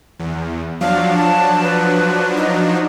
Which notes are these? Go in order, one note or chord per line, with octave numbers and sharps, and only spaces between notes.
E2
F3 F#3 D4 F5
A5
B4
D#4